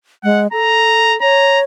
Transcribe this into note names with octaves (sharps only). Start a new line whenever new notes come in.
G#3 F#5
A4 A#5
C#5 A#5